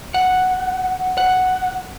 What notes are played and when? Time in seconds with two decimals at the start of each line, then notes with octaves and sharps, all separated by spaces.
0.14 F#5
1.18 F#5